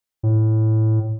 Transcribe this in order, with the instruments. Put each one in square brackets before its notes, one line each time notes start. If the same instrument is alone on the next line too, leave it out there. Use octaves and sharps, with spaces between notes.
[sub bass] A2